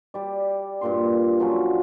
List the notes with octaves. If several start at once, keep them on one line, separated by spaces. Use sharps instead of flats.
G3 D5
G2 A#2 C6
F3 F#3 C#4